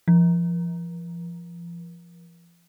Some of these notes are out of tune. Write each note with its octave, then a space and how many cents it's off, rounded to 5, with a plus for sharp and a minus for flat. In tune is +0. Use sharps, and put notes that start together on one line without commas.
F3 -30